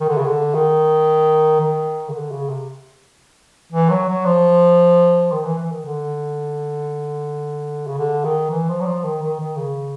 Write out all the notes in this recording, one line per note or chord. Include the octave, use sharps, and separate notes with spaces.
D#3
D3
C#3
D3
D#3
D#3
C#3
D3
C#3
C3
E3
F#3
F#3
F3
D#3
E3
E3
D#3
D3
C#3
D3
D#3
E3
F3
F#3
F3
D#3
D#3
D#3
C#3